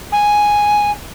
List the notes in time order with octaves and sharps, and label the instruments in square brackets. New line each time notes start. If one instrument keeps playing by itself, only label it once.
[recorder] G#5